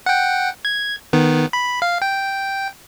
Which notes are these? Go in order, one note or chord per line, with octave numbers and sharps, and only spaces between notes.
F#5 G5
G#6
D#3 B3
B5
F5
G5